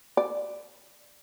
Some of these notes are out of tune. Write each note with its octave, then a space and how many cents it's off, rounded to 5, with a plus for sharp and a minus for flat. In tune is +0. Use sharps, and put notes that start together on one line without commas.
D5 +10